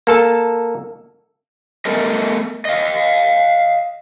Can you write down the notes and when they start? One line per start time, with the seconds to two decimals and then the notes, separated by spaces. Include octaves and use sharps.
0.07 A#3 A4 A5
1.85 A3 B3 A4 A#4 D#5
2.65 D#5 F5